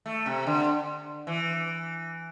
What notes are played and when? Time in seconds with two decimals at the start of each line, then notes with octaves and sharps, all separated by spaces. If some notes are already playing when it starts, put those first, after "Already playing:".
0.06 A3
0.26 C3
0.47 D3
1.27 E3